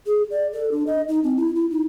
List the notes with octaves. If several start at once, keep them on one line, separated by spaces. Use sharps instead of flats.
G#4
D5
A4
D4
D#5
D#4
C4
E4
E4
D#4